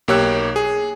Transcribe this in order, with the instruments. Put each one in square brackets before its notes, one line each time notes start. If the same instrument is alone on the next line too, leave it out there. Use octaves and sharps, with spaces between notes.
[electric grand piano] B1 A#3 G4 C#5 E6 F#6
G#4